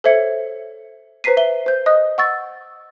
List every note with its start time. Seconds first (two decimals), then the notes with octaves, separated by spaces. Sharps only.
0.04 A4 C5 C#5 E5 G#6 C#7
1.24 B4 C5 A#5 B6 C7 D#7
1.37 E5 G7
1.66 C5 G6
1.86 D#5 D#6 F#6
2.18 F#5 C#6 E6 A6